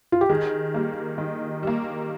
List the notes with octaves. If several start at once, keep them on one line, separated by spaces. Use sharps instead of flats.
F4
G4
D#3 G#4
G3 A#3
D#3
G3 A#3